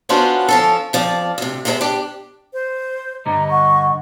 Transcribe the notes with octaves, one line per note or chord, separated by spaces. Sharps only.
B3 C#4 D4 F4 F#4 C5
F3 C#4 A4
F2 F3 D5
D2 C3
G#3 B3 G4 A4 C5 E5
D4 G4
C5
G2 D3 G3 D#5 A#5
F#5 C#6